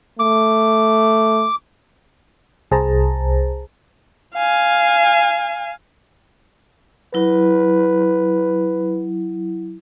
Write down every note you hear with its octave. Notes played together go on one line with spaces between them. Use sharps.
A3 D6
C2 G#4 C5 A5 A#5
F5 G#5
F#3 E4 B4